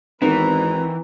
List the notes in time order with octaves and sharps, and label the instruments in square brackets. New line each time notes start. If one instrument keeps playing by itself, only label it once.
[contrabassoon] G#1 [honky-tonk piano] D#3 B3 C4 [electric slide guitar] E3 [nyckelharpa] B4 A#5